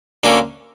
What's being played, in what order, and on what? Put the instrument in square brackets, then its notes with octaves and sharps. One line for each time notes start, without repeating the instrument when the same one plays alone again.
[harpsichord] D2 D3 A#3 C#4